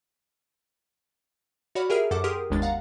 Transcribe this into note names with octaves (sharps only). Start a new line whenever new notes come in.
F#4 C#5 D5 F#5 B5 F6
G4 G#4 A#4 E5 F6
F#2 A4 F#5 D6
G4 G#4 A#4 C6 D#6 F6
G1 D#2 G#3 D4 A6
F5 F#5 A#5